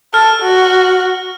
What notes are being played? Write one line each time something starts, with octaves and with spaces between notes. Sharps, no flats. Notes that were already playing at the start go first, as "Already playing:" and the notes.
A4 F6
F#4